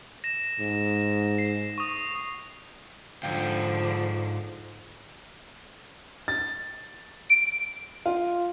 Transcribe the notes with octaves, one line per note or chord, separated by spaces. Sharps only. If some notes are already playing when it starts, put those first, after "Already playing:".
A#6 E7
G#2
C7
C#6 D#6
G#2 D3 F3 F5 G5
A6
D7
F4